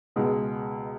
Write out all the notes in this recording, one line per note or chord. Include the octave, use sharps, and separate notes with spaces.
C#2 B2 G#3